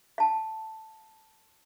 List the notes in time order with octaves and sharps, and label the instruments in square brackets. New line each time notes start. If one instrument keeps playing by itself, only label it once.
[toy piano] F5 A5